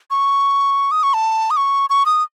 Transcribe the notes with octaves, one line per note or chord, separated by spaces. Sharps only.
C#6
D#6
C#6
A5
D#6
C#6
C#6
D#6